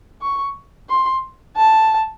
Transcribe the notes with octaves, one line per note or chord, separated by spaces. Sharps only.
C#6
C6
A5